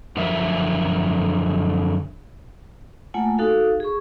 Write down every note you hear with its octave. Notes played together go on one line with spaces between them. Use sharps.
F#2 D3 F3 A#4 E5
A3 A#3 F4 F#5 G#5
D#4 F#4 A4 F5
G#4 C#6